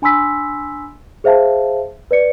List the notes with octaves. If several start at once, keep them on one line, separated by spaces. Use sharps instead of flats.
D4 G#5 B5 C6 E6 B6
G#4 C5 E5 F5 A5
B4 D5 C#7